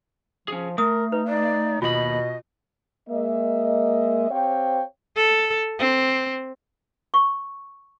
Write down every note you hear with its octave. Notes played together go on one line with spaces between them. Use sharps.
F3 C#4 G#4
A3 A#4 D#6
D#4 B4
D#4 D5
D#2 B2 F4 D#5 B5
G#3 A#3 D#5 E5
C4 G4 C5 C#5 F5 G5
A4
C4
C#6